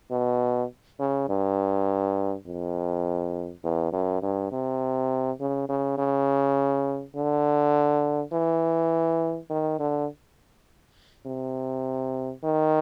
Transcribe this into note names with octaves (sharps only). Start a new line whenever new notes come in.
B2
C#3
G2
F2
E2
F#2
G2
C3
C#3
C#3
C#3
D3
E3
D#3
D3
C3
D#3